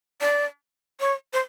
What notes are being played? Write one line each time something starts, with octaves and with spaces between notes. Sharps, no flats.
D5
C#5
C5